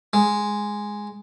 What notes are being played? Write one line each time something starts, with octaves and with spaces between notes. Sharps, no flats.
G#3